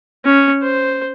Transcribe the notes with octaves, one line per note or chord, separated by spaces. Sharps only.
C#4
C5